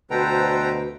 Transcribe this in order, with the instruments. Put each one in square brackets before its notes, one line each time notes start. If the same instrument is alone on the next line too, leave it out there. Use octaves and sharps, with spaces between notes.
[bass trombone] D2 [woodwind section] B2 [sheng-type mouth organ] A4 G5 A#5 [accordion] B4 C5